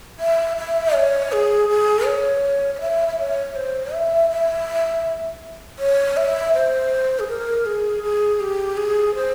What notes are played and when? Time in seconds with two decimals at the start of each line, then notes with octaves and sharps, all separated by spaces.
0.19 E5
0.57 E5
0.94 C#5
1.32 G#4
1.69 G#4
2.06 C#5
2.74 C#5
2.81 E5
3.08 E5
3.19 C#5
3.56 C5
3.93 E5
4.30 E5
5.79 C#5
6.17 E5
6.54 C5
7.19 G#4
7.28 A#4
7.66 G#4
8.03 G#4
8.40 G4
8.77 G#4
9.15 C5